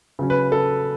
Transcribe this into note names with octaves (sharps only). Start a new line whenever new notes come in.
C#3 F#3 C#4
B4
A4